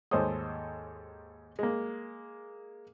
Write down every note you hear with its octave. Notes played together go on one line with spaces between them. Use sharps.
D#2 G#2 A4 C5 C#5 D#6
G#3 A#3